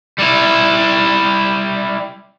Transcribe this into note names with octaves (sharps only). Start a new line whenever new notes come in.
G3 E4